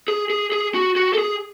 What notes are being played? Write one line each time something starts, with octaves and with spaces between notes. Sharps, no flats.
G#4
G#4
G#4
F#4
F#4
A4
G#4